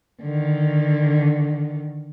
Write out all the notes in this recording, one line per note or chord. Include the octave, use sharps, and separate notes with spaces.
D3 D#3